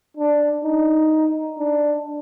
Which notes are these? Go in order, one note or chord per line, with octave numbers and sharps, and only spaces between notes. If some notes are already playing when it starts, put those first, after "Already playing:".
D4
D#4
D4